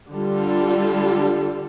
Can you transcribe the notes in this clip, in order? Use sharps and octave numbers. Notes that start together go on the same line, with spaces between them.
D3 G3 D4 F4 A4